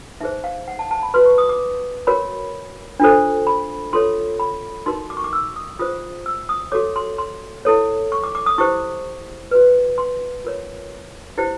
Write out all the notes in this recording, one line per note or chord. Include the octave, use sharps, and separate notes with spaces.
D#4 G#4 C5 E5
F5
F#5
A5
A5
B5
F#4 B4 C6
C#6
D#6
D6
F#4 A#4 C#5 B5
D4 F4 A4 C5
B5
F4 A4 C#5 C6
B5
D#4 F#4 A#4 C6
D6
C#6
D6
E6
D#6
F4 G#4 C5 D#6
E6
D#6
F#4 A4 C#5 D6
C6
C6
E4 A4 C#5
C#6
D6
D6
D#6
E4 G4 C5 C#6
F#4 B4
C6
F4 A#4 C#5
E4 G4 C5